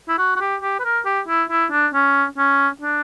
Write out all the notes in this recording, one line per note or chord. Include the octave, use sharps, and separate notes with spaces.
E4
F#4
F#4
G4
G4
B4
A#4
G4
E4
E4
D4
C#4
C#4
D4